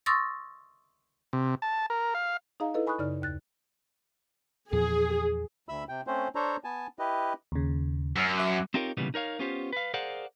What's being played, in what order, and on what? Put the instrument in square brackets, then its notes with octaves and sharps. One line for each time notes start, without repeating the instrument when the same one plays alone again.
[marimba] C6 C#6 D#6 E6 A6 A#6
[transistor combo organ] C3
A5
A#4
F5
[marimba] D#4 G#4 D#5 F5 A#5
E4 A4 B4 D#5
G#5 B5 C#6 D#6 F#6
F#2 C#3 D#4 D5 F6
D#2 F#6 A6
[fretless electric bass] E2 A#2 F3 [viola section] G#4
[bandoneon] D2 E5 B5 E6
C3 G5
A3 C4 C#4 C5
D4 A4 C5 C#5 A#5
B3 G#5 A5
E4 G4 B4 D#5
[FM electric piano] D#2 C#3
[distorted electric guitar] F#2 [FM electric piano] E6 F6
[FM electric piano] E5 D6 F#6
[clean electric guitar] C4 D#4 F4 G4 A#4 C#5
B1 A#2 C#3 E3 G3 B3
D#4 A#4 C#5 F5
B3 C#4 F4 G4 C5
B4 F5
G#4 A#4 C5 D5 F5 F#5